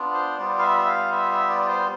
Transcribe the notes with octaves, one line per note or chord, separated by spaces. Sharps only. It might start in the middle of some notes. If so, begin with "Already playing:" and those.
Already playing: B3 D4 F4
C5
G3 B3 F4 D5
F5
E5
E5
F5
E5
E5
D5
C5